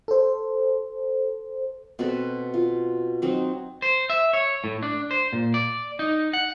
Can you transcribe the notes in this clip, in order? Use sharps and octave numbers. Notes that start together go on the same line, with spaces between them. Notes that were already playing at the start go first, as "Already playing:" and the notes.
A4 C5
B2 C4 A4 B4
F4
F#3 C4 D#4
C5
E5
C#5
A2
D4
C5
A#2
D5
D#4
F#5